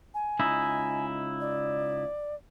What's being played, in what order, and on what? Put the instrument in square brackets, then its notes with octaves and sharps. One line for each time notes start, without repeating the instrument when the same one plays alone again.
[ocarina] G#5
[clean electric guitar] C#2 D#4 E4
[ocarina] D5